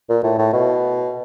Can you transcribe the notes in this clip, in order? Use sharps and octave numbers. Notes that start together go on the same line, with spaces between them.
A#2
A2
A2
B2